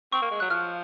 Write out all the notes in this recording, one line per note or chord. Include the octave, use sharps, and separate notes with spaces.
C4 C#6
A#3
G#3
F#3 F#6
F3 F6